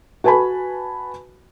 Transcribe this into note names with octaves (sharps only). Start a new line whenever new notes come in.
F#4 B4 G#5 A5 B5